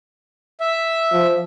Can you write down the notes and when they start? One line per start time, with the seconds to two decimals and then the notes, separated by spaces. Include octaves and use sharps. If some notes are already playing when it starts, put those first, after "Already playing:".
0.60 E5
1.12 F3